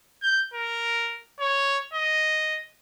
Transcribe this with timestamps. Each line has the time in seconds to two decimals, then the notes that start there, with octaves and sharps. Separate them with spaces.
0.22 G6
0.54 A#4
1.40 C#5
1.94 D#5